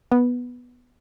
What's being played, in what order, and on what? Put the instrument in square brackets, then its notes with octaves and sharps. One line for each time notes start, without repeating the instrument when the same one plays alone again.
[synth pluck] B3